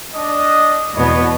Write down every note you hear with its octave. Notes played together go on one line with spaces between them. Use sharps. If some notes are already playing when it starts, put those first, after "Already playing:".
D4 D#5
E2 B2 B3 B4 C#5 D#5